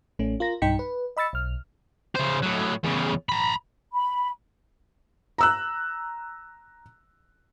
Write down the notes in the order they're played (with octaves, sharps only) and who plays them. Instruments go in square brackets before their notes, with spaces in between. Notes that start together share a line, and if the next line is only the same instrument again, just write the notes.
[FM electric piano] A1 A3 C#4
F4 A#4 A#6
B1 G2 D#4 G5 B6 C#7
B4
D#5 B5 E6 A6 C#7
B1 F6
[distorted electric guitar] C#3 C5
A2 F#3
E2 C#3
A#5 B5
[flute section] B5
[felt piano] A#5 E6 F#6